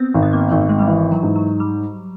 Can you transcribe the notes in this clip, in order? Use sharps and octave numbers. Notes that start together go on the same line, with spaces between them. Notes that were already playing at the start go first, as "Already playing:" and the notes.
Already playing: B3 C4
G#1
B3
A#3
G#1 A3
G#3
G3
E3 G#3
F#3
G#2
F#3
G3